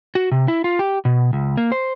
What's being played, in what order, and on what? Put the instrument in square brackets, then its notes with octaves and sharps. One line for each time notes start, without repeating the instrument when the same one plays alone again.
[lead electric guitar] F#4
C3
E4
F4
G4
B2
C#2
A#3
C5